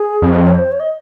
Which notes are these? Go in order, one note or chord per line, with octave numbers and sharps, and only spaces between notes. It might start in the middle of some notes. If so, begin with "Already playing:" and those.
Already playing: G#4
F2
D#5
C#5
C5
C#5
D#5